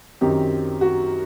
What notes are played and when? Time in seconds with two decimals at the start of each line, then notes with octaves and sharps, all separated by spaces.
0.21 F#2 D#3 F#3 C4 D#4 G4
0.81 F#4